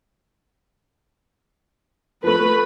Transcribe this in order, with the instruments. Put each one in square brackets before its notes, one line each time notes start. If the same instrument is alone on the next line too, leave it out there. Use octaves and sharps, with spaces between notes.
[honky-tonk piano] F3 A3 [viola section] B4 B5